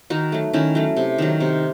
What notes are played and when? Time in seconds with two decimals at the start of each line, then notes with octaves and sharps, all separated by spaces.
0.10 D#3 D#4 F#4
0.32 F#3 A3
0.53 D#3 C#4 E4
0.75 F#3 A3
0.97 C3
1.18 D#3 F#3
1.40 C3